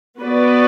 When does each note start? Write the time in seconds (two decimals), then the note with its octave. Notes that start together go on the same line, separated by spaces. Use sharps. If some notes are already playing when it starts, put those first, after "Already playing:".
0.20 B3 F#4 B4 D5